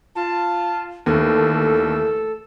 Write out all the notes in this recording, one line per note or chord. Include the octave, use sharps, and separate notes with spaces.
F4 A5
D#2 D3 E3 A3 A4